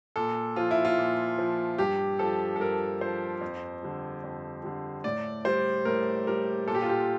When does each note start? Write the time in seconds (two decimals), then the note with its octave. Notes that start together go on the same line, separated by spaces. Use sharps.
0.16 A#2 A4
0.56 F3 F4
0.71 E4
0.85 F4
0.98 A#2
1.38 F3
1.78 G2 G4
2.19 F3 A4
2.56 A4
2.60 G2 A#4
3.01 F3 C5
3.41 F2
3.83 D3 G3
4.24 F2
4.63 D3 G3
5.04 A2 D5
5.45 G3 C5
5.85 A2 A#4
6.27 G3 A#4
6.67 A#2 A4
6.75 G4
6.82 F4
6.89 G4